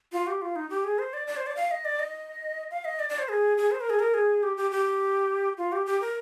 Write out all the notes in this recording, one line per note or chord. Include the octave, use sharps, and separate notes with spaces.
F4
G4
F4
D#4
G4
G#4
C5
D5
D5
C5
D5
F5
D#5
D5
D#5
F5
D#5
D5
D5
C5
G#4
G#4
C5
A#4
G#4
A#4
G#4
G4
G4
G4
F4
G4
G4
A#4